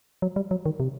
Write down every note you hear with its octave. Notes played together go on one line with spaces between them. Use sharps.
F#3
G3
F#3
D#3
C3